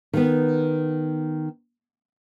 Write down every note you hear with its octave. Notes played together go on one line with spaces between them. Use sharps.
D#3 B3